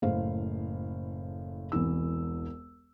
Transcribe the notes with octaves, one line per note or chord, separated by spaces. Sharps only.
F#1 A2 C5 F5
E1 C2 E3 E6